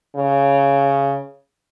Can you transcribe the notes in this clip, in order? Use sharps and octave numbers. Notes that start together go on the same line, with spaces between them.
C#3